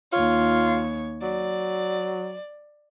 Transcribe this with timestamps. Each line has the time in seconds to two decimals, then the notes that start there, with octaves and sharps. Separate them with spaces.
0.13 D#2 F4 C#5
1.22 F#3 D5